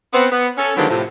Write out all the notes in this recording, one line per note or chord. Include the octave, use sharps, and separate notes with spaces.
B3 C4
B3
C#4 A4
D3 D#3 F3 F#3 G#3 B3
A2 C3 F3